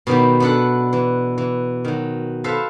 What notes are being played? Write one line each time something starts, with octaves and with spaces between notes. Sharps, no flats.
B2 D#3 F#3 B3 G4
B3 D4 A4 B4 F#5
E3
E3
D#3 F#3
A4 B4 C5 E5 F5